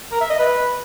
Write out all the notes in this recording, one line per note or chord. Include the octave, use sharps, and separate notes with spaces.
A#4
E5
D#5
B4